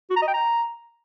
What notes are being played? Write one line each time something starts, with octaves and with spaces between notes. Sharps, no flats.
F#4
A#5
D#5
G5
A#5